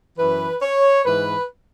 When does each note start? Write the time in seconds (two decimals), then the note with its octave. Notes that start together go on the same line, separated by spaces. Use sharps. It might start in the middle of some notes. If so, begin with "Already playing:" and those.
0.18 F#2 E3 B4
0.62 C#5
1.05 G#2 E3 B4